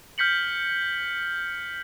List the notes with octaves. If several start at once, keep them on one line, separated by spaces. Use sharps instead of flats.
F6 G6 B6 C#7 F#7